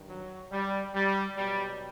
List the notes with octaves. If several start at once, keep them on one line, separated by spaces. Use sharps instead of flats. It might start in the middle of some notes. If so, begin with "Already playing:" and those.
Already playing: G2 D#3
F#3
G3
G3
B2 F#3 G3